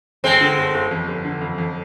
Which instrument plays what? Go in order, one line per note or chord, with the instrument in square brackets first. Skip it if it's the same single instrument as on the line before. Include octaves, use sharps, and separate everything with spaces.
[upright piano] G1 [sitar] G#3 C4
[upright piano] D3
G1
G1
F2
G1
D3
F2
F2